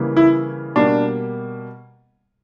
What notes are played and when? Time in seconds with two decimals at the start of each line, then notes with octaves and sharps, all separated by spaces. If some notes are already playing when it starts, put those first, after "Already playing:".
Already playing: C#3 E3 G3 A#3
0.16 E4
0.76 B2 G3 A#3 D4